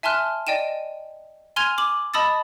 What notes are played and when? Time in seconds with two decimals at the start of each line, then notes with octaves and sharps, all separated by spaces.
0.03 E5 G#5 A5 C6 F6 F#6
0.47 D5 D#5 G5 D#7 E7
1.56 G#5 C6 F6 G#6 D#7 F7
1.78 D6 F#7
2.14 D#5 A5 B5 D#6 E6 A6